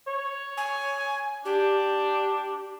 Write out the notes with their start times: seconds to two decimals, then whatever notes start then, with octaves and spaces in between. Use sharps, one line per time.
0.07 C#5
0.57 G#5
1.45 D4 G4